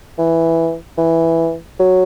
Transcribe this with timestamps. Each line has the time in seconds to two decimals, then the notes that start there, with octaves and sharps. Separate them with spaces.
0.18 E3
0.98 E3
1.80 F#3